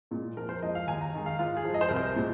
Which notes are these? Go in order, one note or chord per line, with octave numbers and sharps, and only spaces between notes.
A#2 G#3
F2 A#4
C5
F3 G#3 D#5
F5
D#2 G#5
A#5
D#3 G#3
F5
G#2 F4
G#4
F3
G#3 D#5
C5
C2 A#4
C5
A#2 G#3